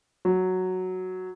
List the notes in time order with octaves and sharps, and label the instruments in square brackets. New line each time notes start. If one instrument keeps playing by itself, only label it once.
[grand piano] F#3